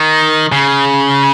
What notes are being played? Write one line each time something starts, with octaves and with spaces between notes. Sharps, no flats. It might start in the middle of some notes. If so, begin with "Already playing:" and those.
Already playing: D#3
C#3